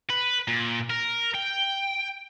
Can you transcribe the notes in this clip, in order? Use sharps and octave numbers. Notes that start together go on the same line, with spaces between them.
B4
A#2
A#4
G5